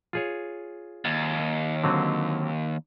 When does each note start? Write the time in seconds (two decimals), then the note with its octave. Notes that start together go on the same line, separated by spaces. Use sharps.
0.13 F4 G#4 C#5
1.05 D#2
1.84 D3 F#3 C4